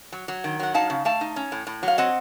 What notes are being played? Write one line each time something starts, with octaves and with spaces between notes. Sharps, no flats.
F#3
F#3
D#3
F#3 F#5
D#4 F5 A5
C#3
A3 F5 A5
D#4
C#4
A2
A2
F#3
F5
C4 D#5 F#5